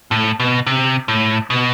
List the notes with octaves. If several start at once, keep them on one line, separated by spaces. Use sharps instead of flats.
A2
B2
C3
A2
B2